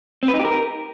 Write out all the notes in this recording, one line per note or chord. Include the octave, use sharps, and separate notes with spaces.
C4
B4
D#4
G4
A#4